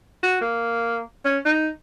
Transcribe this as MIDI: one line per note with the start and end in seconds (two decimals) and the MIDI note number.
0.23 0.40 66
0.41 1.02 58
1.25 1.38 61
1.45 1.69 63